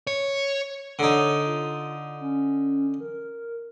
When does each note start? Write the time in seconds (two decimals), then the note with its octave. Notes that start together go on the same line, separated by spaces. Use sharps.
0.07 C#5
0.99 D3 D#4 C#5
1.46 F4
2.21 C#4
3.00 A#4